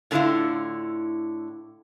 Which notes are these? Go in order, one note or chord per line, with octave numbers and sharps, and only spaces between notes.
A2 D3 B3 C#4 E4 F4